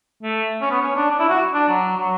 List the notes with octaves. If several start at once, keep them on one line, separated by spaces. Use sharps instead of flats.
A3
C#4
B3
C#4
D4
D4
E4
F#4
D4
F#3
F#3